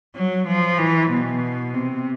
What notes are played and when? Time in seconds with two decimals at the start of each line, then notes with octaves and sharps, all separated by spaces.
0.16 F#3
0.47 F3
0.78 E3
1.10 B2
1.74 C3